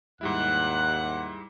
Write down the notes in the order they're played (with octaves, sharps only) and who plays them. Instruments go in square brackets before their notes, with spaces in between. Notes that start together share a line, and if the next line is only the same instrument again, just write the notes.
[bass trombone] D#2 [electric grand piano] G#2 G3 E4 [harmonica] F#5 [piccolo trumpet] F#6